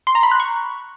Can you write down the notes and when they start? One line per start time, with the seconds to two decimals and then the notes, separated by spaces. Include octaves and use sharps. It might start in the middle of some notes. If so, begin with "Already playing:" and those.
0.07 C6
0.15 A#5
0.23 B5
0.32 F#6
0.40 C#6